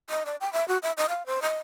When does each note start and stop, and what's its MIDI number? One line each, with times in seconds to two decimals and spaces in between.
0.10 0.23 75
0.26 0.36 74
0.41 0.51 79
0.53 0.66 76
0.68 0.78 66
0.83 0.92 76
0.97 1.06 75
1.09 1.26 77
1.26 1.42 72
1.42 1.58 75